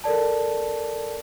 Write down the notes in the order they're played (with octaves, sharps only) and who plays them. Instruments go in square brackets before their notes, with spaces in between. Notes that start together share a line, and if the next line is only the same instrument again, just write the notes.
[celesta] A4 A#4 D5 A5